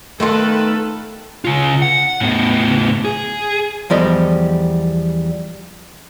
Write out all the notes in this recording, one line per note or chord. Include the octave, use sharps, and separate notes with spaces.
D#3 A3 B3 F4 A4 B4
C#3 F4
F#5
A2 B3
G#4
E2 F3 G3 A4 D#5